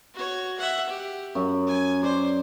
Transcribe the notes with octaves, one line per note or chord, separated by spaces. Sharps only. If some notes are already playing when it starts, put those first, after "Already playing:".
F#4 C#5
E5 F#5
G4
F#2
G#5
C5 D5